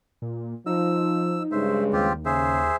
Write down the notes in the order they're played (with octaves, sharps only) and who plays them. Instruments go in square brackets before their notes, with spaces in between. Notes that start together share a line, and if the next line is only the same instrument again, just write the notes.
[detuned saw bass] A#2
[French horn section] F3 [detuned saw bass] D#4 [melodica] E6
[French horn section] G2 C#3 G#3 [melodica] C5 E5
[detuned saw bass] D#2 [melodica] C4 F4 G4
[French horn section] C#3 [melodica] G#4 C5 E5